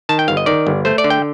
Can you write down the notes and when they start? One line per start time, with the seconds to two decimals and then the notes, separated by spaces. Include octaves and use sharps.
0.09 D#3 A5
0.19 G5
0.28 G1 F5
0.37 D#5
0.46 D#3 D5
0.67 G1
0.85 A3 C5
0.98 D5
1.04 D3
1.10 G5